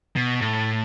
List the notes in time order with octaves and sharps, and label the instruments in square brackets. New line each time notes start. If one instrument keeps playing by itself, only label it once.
[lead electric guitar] B2
A2